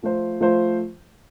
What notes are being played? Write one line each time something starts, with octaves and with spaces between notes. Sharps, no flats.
F3 A3 F4 C5
F3 A3 F4 C5